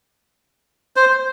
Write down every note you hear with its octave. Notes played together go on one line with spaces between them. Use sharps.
C5